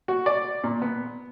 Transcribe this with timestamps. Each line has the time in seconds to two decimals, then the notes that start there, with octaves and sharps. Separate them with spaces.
0.08 F#4
0.26 D5
0.64 A#2
0.82 B3